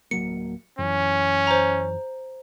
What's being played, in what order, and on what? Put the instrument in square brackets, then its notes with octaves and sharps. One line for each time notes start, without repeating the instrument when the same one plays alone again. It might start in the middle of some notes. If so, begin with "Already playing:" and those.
[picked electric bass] D1 F#3 A#3 [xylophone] C#7
[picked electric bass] F#2 E3 [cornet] C#4
[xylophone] C5 A#5